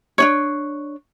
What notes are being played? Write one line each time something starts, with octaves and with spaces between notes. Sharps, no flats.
D4 D#4 C#5